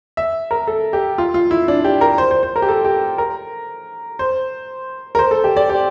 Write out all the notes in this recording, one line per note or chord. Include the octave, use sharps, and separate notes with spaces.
E5
A#4
A4
G4
F4
F4
E4
D4
G4
A#4
C5
C5
C5
A#4
G4
A4
G4
A#4
C5
A#4
C5
A4
G4
D5
G4